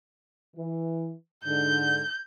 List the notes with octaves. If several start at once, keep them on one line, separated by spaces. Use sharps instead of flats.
E3
G#2 D3 G6